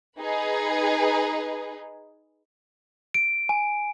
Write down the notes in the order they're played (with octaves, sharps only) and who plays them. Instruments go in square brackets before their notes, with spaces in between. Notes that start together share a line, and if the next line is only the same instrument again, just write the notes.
[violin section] D#4 G#4 B4
[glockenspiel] D7
G#5